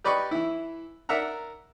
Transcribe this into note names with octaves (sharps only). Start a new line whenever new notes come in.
G4 B4 D5 D#5 B5 C#6
E3 E4
A#4 D5 E5 F#5 A#5